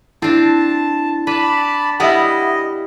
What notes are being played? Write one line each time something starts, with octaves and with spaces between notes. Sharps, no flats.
C4 D4 E4 A5
B4 D5 A5 B5
G3 B3 E4 D#5 E5 F#5